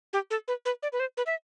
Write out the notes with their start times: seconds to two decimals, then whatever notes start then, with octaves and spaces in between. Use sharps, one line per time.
0.13 G4
0.30 A4
0.48 B4
0.65 B4
0.83 D5
0.93 B4
1.00 C5
1.17 B4
1.26 E5